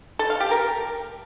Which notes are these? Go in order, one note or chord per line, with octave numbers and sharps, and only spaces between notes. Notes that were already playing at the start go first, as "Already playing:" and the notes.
A4
F5
G4
A#4